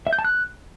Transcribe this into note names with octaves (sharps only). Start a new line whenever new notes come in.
E5
G6
A5
F#6